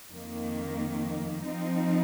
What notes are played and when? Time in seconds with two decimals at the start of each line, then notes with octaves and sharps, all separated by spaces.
0.13 F2 D#3 A#3
1.45 F3 C4 D#4